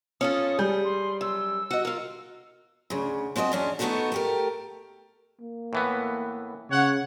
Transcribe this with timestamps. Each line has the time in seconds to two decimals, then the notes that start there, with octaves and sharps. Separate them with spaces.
0.21 C#4 F4 A4 D#6
0.59 G3 G#4 G6
0.85 C6
1.21 F#2 E6
1.71 F#4 D#5
1.85 F4 A#4
2.90 D2 C#3
3.36 G#2 C4 F#4 D5 D#5
3.52 E2 C#4 D4
3.79 A3 B3 D#4 F4 F#4 A4
4.12 A3 G4 A#4
5.41 A#3
5.73 A2 E3 B3
6.70 C#3 C#5 F#5